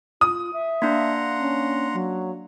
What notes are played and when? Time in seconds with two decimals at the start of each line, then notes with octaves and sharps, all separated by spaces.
0.21 F4 D#6
0.53 E5
0.82 A#3 D4 F#5 A#5 C6
1.39 C#4
1.94 F#3